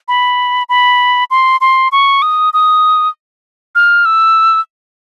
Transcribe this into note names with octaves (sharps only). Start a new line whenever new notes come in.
B5
B5
C6
C6
C#6
D#6
D#6
F6
E6